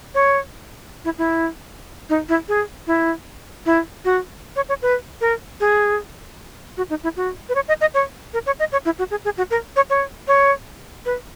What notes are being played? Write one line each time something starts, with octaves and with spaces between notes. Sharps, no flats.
C#5
E4
E4
D#4
E4
G#4
E4
E4
F#4
C#5
C#5
B4
A#4
G#4
F#4
D#4
E4
F#4
B4
C#5
D#5
D#5
C#5
A#4
C#5
D#5
C#5
E4
F#4
G#4
G#4
F#4
A#4
C#5
C#5
C#5
B4